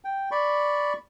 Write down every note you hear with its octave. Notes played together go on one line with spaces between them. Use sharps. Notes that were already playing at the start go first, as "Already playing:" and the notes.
G5
D5 B5 C#6